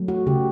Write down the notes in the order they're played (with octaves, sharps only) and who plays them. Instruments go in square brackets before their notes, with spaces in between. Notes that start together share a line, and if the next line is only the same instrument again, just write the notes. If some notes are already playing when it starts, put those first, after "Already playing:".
Already playing: [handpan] F#3 A3
F#4
C#3 G4